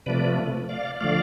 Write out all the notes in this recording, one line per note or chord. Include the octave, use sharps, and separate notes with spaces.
C3 F3 A3 B4 D5
D5 F5
D3 F3 A3 D5 F5